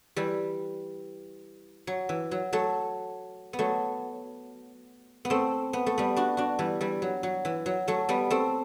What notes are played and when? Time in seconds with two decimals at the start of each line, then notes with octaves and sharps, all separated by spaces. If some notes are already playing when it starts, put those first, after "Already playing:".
0.16 E3 G3
1.87 F#3
2.09 E3
2.31 F#3
2.53 F#3 A3
3.53 B3
3.59 F#3 A3
5.25 B3
5.30 A3 C4
5.73 B3
5.86 A3
5.98 G3 B3
6.16 D4 F#4
6.37 D4 F#4
6.59 E3 G3
6.81 E3 G3
7.02 F#3
7.23 F#3
7.45 E3
7.66 F#3
7.88 F#3 A3
8.09 G3 B3
8.30 A3 C4